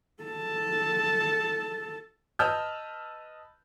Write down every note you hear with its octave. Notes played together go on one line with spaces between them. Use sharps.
A4 A5
B4 D#5 A5 E6 F6 G6